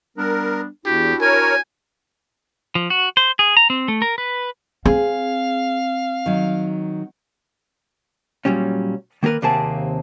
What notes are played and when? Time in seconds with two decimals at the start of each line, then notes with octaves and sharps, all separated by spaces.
0.18 G3 B3 D4 A#4
0.86 E2 D4 E4 F#4 G4
1.21 A#4 C#5 G#5
2.75 F3
2.90 F#4
3.17 C5
3.39 G#4
3.57 A#5
3.70 C4
3.88 A3
4.02 A#4
4.18 B4
4.85 C4 G#4 F5
6.26 D#3 F#3
8.45 A#2 F#3 G3 C#4
9.23 D#3 A#3 G4 A#4 B4
9.42 D#2 C3 A#3 C4 G#4 A5